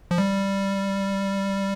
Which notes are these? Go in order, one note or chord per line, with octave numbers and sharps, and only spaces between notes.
F3
G3